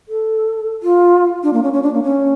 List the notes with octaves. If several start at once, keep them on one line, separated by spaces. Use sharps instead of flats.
A4
F4
D4
A#3
C#4
C#4
D4
A#3
C#4